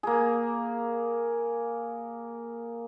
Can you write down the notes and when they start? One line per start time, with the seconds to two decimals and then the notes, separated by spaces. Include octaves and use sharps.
0.03 A#3 G#4